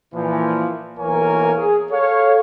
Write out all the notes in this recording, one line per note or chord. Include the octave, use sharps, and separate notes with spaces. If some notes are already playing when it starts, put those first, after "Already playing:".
A#2 E3 F3
B1 E3 A#3 A#4 C#5 G#5
G#4
A4 C#5 F5